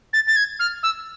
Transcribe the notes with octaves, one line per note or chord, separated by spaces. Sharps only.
A6
A6
G#6
F6
E6